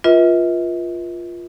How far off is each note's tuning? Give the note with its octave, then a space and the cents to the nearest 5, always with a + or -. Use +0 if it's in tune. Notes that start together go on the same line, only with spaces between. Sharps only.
F4 +0 B4 -40 E5 -45